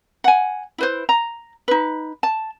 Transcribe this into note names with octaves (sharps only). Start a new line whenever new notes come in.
F#5 G#5
E4 B4 C5
A#5
D#4 B4
A5